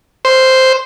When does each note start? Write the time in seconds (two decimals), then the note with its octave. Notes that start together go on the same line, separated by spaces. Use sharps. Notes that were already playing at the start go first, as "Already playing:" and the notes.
0.25 C5